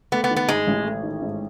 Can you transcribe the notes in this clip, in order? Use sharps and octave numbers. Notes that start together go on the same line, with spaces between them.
A3 B3
B3
D#3
B3
G#2 G#3
A1
A3
D#3
G#2